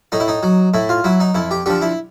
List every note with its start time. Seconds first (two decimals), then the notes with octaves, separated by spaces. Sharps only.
0.12 A2 D#4
0.20 E4
0.28 D#4
0.43 F#3
0.74 A2 E4
0.89 F4
1.04 F#3 E4
1.20 D#4
1.34 F2 E4
1.51 G4
1.66 D3 F3 G4
1.81 E4